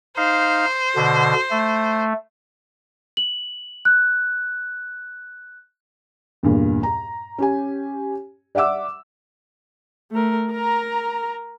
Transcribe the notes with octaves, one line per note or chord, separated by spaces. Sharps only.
D#4 C5 F5
B2 D3
A3
F#7
F#6
E2 G2 A#2
A#5
C#4 G4 G#5
D5 E5 F#5 D6 E6
A3 A#4
A#4 A#5